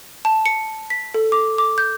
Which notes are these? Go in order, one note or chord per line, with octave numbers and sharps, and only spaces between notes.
A5
C#7
B6
A4
D6
D6
G6